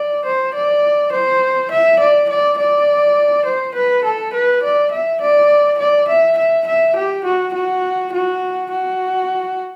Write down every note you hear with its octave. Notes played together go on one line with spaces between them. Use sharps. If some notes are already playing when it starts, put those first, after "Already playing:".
Already playing: D5
C5
D5
C5
E5
D5
D5
D5
C5
B4
A4
B4
D5
E5
D5
D5
E5
E5
E5
G4
F#4
F#4
F#4
F#4